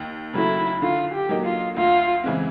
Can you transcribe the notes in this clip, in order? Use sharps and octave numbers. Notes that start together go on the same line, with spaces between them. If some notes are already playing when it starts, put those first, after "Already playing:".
Already playing: D#2
C#3 F#3 A3 E4
D3 F4
G4
F#3 A#3 D#4
F4
D2 F4
C#3 E3 G#3 C4